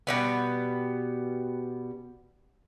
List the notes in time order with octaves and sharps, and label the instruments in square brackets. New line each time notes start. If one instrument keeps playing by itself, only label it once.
[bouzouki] B2 G3 B3